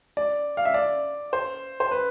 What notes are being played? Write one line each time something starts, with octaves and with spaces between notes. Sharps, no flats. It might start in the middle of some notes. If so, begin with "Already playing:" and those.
D5
F5
E5
D5
C5
C5
B4